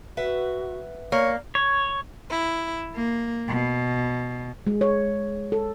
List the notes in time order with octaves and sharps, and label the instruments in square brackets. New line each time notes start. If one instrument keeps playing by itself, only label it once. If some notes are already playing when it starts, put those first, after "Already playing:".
[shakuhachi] F#4 [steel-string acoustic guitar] B4 E5 F#5
[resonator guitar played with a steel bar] A#3 [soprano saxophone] C#5 [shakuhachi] D5
[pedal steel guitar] C#5
[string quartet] E4
A#3
B2
[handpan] G#3
C#5
A4